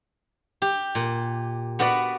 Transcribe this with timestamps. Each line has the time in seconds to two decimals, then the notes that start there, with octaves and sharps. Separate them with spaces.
0.62 G4
0.95 A#2
1.79 B3 F#4 B4 D5 F#5